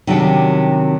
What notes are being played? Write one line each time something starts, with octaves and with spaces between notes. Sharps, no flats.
C3 D#3 F#3 C#4 D4 G4